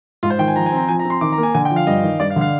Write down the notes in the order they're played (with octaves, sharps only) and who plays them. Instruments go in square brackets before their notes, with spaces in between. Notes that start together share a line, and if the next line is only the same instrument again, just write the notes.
[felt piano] G#2 [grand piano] F4
[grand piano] C5
[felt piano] D#3 [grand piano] G5
[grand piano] G#5
[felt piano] F3 [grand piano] A#5
[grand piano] G#5
[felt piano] C4 [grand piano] A#5
[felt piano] F3 [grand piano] G#5
[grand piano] A#5
[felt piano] C4
[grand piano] C6
[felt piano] D#3 [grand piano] D6
[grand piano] A#5
[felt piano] A#3
[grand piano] G#5
[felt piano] D3 [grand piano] G#5
[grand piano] G5
[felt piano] F3
[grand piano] F5
[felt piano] G2 [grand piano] D#5
[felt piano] D#3
[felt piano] G2 [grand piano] D5
[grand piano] F5
[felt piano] D3
[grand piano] F5